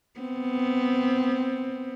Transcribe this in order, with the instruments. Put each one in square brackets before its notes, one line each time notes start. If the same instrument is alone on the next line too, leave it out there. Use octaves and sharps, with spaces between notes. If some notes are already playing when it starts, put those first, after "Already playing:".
[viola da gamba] B3 C4